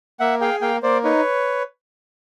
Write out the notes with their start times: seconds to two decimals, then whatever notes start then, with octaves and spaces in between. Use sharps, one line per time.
0.19 A#3 E5 F#5
0.41 G#4 F5 G5
0.61 A#3 F5 G5
0.83 A#3 C5 D5
1.04 D#4 B4 C#5